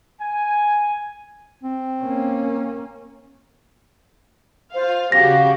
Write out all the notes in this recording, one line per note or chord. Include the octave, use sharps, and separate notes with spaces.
G#5
C4
A#3 C#4
F4 C5 F5
C#3 F#4 G4 F5 A#6